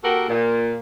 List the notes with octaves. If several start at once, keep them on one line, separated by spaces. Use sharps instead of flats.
A#3 F#4 G4 A4 A#4 F#5
A#2